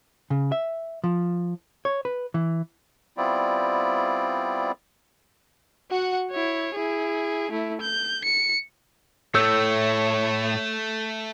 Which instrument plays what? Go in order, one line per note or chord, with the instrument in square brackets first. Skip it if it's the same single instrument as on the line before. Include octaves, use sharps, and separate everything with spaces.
[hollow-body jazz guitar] C#3
E5
F3
C#5
B4
E3
[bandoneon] G3 B3 C4 E4 F4 D5
[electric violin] F#4 F#5
E4 C#5
E4 G#4
A3 E4
G6
C#7
[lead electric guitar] A2 [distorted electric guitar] A3 [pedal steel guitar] A4 E6 G6 [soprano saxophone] C#5